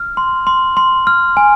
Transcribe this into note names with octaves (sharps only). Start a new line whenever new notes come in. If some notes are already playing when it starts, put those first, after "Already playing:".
Already playing: F6
C6
C6
C6
F6
G#5